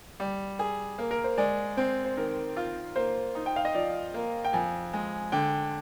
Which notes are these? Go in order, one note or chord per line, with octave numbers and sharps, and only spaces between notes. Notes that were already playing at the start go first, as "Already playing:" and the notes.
G3
G#4
A#3
A#4
C5
G#3 D5
C4 C5
C5
D#3 A#4
F4
A#3 C5
D#4
G5
F5
D#5
F3 D5
A#3
G5
F2 G#5
G#3
D3 G5